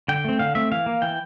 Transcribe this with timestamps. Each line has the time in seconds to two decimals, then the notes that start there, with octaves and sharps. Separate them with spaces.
0.08 D3 G5
0.25 A3 C4
0.39 D3 F5
0.55 A3 C4 E5
0.72 E3 F5
0.86 A#3
1.02 E3 G5